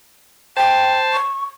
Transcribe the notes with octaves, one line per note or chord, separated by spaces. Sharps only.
C5 G5 A5
C#6